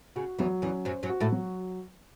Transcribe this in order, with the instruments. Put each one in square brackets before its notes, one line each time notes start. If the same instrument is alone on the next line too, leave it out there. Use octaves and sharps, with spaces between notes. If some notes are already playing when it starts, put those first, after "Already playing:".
[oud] C#3 [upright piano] F#4
[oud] E2 E3 [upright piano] F#3
[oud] E2 E3 [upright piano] C#4
[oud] F#2 F#3 [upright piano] C5
[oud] F#2 F#3
[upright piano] F#4
[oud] A2 A3
[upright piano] F#3